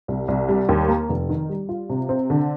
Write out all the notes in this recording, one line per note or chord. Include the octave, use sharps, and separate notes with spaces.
C2
C2
G3
D#2
A#3
F1
D#3
G3
F4
C3
C4
D3